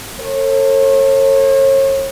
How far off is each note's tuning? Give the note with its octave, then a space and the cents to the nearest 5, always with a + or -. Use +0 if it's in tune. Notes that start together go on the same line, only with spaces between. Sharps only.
A4 +35 C#5 -40